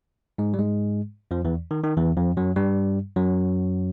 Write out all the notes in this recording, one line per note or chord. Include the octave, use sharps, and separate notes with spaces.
G#2 G#3
G3
G#2 G#3
F2 F3
E2 E3
D#3
D#3
E2 E3
F2 F3
F#2 F#3
G2 G3
F#2 F#3